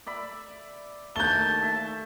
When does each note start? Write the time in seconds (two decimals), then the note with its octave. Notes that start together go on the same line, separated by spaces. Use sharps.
0.07 D5 E5 B5
1.16 D#2 A3 A5 G6 G7
1.62 E5